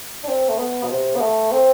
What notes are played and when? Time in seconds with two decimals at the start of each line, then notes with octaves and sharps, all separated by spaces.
0.23 D4
0.28 C4
0.49 A3
0.58 B3
0.83 B2
0.90 C3
1.15 B3
1.21 A3
1.52 C4